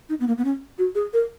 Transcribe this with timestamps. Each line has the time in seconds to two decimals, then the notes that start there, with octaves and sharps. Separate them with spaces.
0.09 D#4
0.20 B3
0.28 A#3
0.38 B3
0.45 C#4
0.78 F#4
0.95 G#4
1.13 A#4